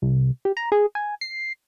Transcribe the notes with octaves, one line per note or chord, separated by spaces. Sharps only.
C2
G4
A#5
G#4
G#5
C7